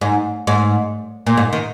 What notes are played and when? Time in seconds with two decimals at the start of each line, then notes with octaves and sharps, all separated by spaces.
0.01 G#2
0.47 G#2
1.27 A#2
1.37 G#2
1.53 D#3